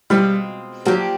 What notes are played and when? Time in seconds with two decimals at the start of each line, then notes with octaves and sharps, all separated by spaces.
0.10 B2 G3 G#3 C4 F4
0.86 F3 F#3 A#3 D4 G4